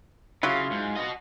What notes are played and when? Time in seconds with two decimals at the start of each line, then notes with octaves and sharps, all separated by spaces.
0.43 C#3 F#3 E4 F4
0.71 G#2
0.97 F#4 D#5